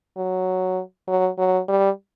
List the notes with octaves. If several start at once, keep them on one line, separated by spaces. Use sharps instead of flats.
F#3
F#3
F#3
G3